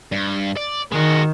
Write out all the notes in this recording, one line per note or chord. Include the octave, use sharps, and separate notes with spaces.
G2
D5
D#3 G#3 F#4